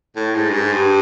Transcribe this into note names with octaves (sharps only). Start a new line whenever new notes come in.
A2
G#2
G2
G#2
G2